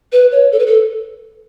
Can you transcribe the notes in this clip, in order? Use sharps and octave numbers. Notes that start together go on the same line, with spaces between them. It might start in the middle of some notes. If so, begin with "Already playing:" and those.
B4
C#5
A4
B4
A4